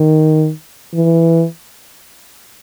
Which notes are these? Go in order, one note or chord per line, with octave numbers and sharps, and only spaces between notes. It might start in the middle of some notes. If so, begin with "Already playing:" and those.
Already playing: D#3
E3